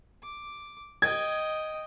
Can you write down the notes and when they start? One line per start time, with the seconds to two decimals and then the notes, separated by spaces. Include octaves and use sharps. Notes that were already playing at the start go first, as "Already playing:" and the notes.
0.22 D6
1.02 D#5 G5 G#6